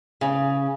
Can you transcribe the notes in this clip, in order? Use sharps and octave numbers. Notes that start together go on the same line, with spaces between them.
C#3